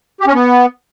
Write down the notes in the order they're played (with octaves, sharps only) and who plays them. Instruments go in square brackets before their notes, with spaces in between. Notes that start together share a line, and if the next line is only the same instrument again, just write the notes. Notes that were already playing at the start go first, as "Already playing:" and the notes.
[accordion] G4
C#4
B3